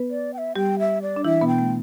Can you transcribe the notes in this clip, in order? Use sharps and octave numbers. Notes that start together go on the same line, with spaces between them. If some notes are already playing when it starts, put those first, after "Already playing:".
Already playing: B3 B4
D5
G5
E5
G3 G4 G5
E5
D5
D4
E3 E4 E5
B2 B3
G5
A3